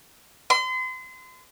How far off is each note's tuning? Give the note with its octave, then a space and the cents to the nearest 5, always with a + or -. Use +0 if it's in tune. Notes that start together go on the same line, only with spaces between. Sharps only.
C6 -35